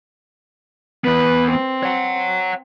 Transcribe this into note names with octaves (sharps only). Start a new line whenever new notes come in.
E3 B3 B4
C4
C#5 F#5